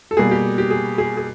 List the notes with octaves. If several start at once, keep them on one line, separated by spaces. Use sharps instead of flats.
A4
B2 G3 A#3 G#4
G4
G4
G#4
G#4
G#4